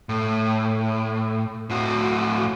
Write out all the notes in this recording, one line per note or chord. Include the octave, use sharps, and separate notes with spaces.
A2
A2 F#4